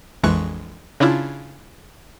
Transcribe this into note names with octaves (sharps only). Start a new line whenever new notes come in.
A#1 F2 E3 G#3 C#6 F#6
C#3 C#4 D4 E4 F4